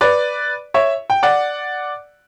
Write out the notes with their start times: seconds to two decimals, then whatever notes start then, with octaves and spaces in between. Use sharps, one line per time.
0.01 B4 D5
0.74 C#5 E5
1.10 G5
1.23 D5 F#5